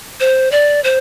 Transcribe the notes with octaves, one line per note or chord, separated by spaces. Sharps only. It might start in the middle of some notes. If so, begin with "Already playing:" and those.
C5
D5
C5